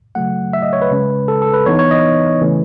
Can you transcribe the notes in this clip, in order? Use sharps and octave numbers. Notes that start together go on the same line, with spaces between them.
C#3 F#3 A3 F#5
E5
D#5
C#5
B4
C#3 G#3 C#4
A4
A4
B4
E3 B3 D#4 C#5
C#5
D#5
C#3 E3 A3 C#4